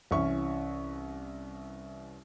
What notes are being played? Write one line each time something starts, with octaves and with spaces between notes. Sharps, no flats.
C2 E3 C#4 E5 C#6